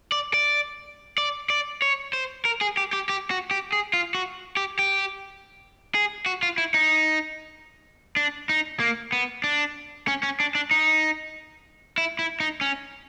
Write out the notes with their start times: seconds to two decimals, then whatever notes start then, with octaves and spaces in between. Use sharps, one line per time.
0.12 D5
0.34 D5
1.18 D5
1.50 D5
1.82 C#5
2.13 C5
2.45 A#4
2.61 G#4
2.77 G4
2.93 G4
3.09 G4
3.31 F#4
3.51 G4
3.72 G#4
3.93 F4
4.15 F#4
4.57 G4
4.79 G4
5.95 G#4
6.26 F#4
6.43 F4
6.58 E4
6.74 D#4
8.16 D4
8.49 D#4
8.80 A#3
9.12 B3
9.44 D4
10.08 C#4
10.23 C#4
10.40 D4
10.55 D4
10.71 D#4
11.98 E4
12.19 E4
12.40 D#4
12.61 C#4